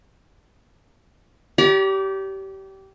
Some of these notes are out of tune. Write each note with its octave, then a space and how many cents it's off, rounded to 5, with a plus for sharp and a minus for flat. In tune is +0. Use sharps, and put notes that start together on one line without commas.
G4 -20 D5 -45 A#5 +30